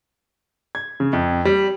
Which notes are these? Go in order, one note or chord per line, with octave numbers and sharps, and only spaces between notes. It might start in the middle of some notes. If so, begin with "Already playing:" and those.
G#6
C#3
F2
G3